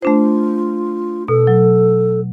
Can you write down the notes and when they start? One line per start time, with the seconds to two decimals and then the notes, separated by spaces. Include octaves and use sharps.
0.02 A3 D4 F4 C5
1.28 B2 A4
1.47 F#3